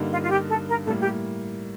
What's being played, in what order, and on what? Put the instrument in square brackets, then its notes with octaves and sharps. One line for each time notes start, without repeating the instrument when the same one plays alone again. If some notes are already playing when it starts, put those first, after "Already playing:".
Already playing: [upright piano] G2 D3 G3 A#3 D#4
[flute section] F4
F4
G4
A4
A#4
[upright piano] A2 G3 A#3 [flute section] A4
[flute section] G4